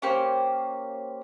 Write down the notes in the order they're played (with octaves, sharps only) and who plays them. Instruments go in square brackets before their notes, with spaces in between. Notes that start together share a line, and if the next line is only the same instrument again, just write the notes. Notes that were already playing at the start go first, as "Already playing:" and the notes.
[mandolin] A#3 C#4 G4 C5